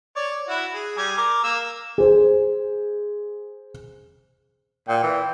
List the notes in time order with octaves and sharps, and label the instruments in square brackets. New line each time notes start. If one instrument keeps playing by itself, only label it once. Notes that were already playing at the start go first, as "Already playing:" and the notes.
[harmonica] C#5 D5
E4 F#4
G#4
G3 G#5
A#4 D6
A#3 E6
[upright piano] G#4 C5
[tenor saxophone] A#2 [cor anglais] G5
[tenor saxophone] E3